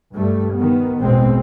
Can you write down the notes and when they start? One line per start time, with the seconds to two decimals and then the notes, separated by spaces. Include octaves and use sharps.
0.15 G2 G3 A3
0.55 D#3 B3
0.99 A1 E2 B2 G#3 C4